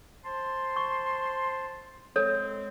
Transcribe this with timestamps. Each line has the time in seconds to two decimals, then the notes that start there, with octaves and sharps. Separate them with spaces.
0.25 C5 A5 C6
0.76 C#6
2.16 G#3 C4 A4 C#5